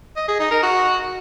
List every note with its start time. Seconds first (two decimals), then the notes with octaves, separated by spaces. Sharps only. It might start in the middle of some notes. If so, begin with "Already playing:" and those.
0.17 D#5
0.28 G#4
0.40 D#4
0.51 A#4
0.63 F#4